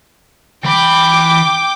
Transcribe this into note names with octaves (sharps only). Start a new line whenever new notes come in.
E3 G5 B5 D6